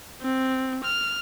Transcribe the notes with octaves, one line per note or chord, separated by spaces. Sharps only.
C4
F6